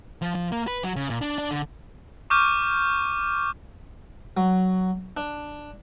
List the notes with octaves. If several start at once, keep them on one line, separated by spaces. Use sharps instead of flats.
F3
F3
A#3
B4
F#3
C#3
A#2
D4
D4
D3
C#6 D6 F6 G6 D#7
F#3
D4